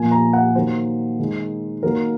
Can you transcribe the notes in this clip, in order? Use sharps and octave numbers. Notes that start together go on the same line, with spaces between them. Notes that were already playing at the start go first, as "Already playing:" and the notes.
Already playing: A#2 F3 A#3 G#5
A#5
F#5
D#3 F#3 A#3 C5
D#3 G#3
D#3 F#3 A#3 A#4